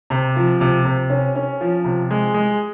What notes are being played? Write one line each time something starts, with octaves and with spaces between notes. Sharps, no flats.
C3
F3
C3
C3
C#4
C#4
F3
C3
G#3
G#3